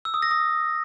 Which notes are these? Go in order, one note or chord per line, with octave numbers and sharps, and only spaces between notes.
E6
D#6
A#6
D#6